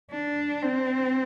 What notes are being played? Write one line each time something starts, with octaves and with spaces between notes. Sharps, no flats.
D4
C4